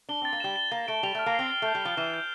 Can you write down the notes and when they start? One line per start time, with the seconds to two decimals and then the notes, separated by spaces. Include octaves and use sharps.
0.09 D4 G7
0.21 C4 A6
0.33 A#3
0.40 G3 E7
0.56 G7
0.71 A#3 A6
0.88 A3 D7
1.03 G3 F7
1.15 A3 F6
1.26 A#3
1.35 C4 C7
1.51 G7
1.62 A3 G6
1.75 G3
1.82 F3 D7
1.97 E3 E7
2.14 G6